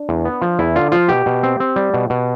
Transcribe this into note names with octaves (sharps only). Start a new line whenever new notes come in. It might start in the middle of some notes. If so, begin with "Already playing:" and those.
Already playing: D4
E2
B3
F3
E2 E4
D3 F4
F3 F4
B2 G4
B2
C4
C4
G3
B2
B2